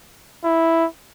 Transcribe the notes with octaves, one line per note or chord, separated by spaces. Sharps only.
E4